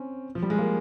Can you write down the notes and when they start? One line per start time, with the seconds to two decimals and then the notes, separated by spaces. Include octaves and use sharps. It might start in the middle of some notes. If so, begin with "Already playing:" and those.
Already playing: C4 C#4
0.35 F3
0.43 G3
0.50 G#3
0.58 A#3